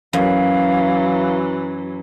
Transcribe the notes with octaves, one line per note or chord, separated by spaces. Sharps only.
F#2 E3 F#3 F5